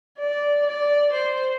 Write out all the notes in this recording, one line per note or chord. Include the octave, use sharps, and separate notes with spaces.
D5
D5
C5